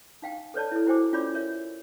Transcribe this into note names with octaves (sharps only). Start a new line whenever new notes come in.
D#4 F5 G5
A4 B4 C#5 D5 A5
E4 A4
E4 F#4 C5 G5 G#5 D6
C#4 F4 C#5 D5 B5 D6
A#4 C#5 E5